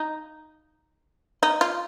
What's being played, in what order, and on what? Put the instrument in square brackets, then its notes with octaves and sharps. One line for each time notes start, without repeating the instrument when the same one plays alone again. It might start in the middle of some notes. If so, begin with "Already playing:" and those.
Already playing: [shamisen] D#4
D#4
F4